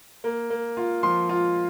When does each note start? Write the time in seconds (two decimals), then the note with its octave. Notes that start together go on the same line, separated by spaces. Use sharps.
0.24 A#3
0.50 A#3
0.77 F4
1.03 F3 C6
1.29 F4